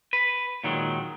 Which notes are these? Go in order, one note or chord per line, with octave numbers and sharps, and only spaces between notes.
B4
A#2 D#3 F#3 G#3